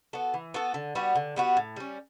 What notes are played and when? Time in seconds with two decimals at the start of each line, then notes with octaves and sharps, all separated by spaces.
0.13 B3 F#4 A4
0.34 E3
0.54 B3 F#4 A4
0.74 D3
0.95 G3 B3 F#4
1.15 D3
1.36 G3 B3 F#4
1.57 A2
1.76 G3 C#4